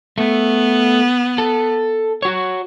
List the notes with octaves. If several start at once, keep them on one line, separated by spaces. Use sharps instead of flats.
A3 B3
A4
F#4 C#5